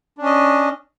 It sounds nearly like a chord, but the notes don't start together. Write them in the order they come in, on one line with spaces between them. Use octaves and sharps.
D4 C#4 D#5